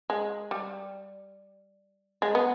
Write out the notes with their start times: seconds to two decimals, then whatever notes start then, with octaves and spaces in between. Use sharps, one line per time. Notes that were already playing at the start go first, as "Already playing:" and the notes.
0.10 G#3
0.51 G3
2.22 G#3
2.35 B3